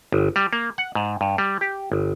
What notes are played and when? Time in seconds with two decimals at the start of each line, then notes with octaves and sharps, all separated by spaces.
0.12 G1
0.36 G3
0.53 A#3
0.78 F#5
0.95 G#2
1.21 G2
1.38 G3
1.61 G4
1.92 G1